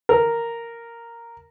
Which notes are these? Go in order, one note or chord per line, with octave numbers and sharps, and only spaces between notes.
A#4